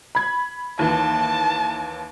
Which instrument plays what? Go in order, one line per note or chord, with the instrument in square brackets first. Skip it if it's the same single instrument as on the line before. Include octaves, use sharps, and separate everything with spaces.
[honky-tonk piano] B5 G#6
[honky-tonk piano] D#2 E3 [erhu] A5